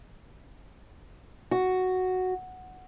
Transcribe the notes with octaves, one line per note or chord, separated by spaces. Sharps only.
F#4